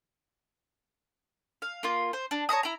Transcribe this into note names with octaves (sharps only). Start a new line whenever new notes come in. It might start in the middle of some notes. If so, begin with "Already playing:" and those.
F5
A#3 F4
C5
D4
C#5 A5 A#5 D#6
E4 A#5